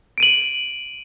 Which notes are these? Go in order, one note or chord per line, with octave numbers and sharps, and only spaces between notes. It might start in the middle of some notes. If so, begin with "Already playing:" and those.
D7 D#7 F#7